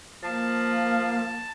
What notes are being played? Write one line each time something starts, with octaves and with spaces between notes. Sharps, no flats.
F3 A#3 A5